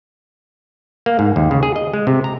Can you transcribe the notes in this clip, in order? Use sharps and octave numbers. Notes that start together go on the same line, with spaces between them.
A#3
G#2
D#2
C#3
G#4
D#5
G#3
C3
A#5